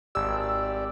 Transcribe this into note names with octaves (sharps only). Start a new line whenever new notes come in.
G#1 G4 D5 E6